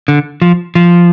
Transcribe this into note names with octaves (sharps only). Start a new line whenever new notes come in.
D3
F3
F3